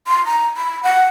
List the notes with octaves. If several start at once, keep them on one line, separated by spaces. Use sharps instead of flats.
C6
A#5
B5
F#5